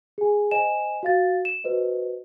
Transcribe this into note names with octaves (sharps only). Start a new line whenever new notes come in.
G#4 G#5
C5 D#5 G#5 E7
F#4 F5 A6
E7
F#4 B4 C5 D#5